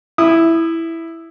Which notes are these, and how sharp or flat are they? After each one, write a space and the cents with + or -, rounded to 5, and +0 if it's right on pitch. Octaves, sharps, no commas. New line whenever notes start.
E4 +0 D#6 -25